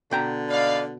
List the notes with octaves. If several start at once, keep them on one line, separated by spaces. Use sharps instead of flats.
B2 D3 G5 A#5
D#4 B4 D5 F5